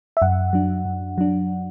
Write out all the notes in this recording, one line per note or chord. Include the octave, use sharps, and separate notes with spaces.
E5
F#2 F#5
F#3 D4
F#2
F#3 D4